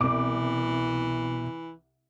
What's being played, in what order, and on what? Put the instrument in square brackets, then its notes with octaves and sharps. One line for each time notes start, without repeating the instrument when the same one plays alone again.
[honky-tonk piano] C2 D6 [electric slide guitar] B2 [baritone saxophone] E3